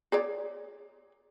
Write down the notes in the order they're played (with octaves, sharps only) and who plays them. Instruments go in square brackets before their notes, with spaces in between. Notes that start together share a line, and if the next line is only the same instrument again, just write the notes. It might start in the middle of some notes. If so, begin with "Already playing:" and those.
[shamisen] G#4 C#5 D5